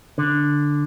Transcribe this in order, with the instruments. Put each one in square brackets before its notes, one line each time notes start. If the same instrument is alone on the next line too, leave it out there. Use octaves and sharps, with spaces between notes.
[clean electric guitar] D3